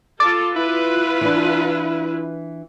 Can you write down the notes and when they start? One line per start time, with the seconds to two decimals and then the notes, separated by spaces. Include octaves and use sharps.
0.20 F4 A4 D6 A6
0.56 E4 F4 B4
1.21 E3 D4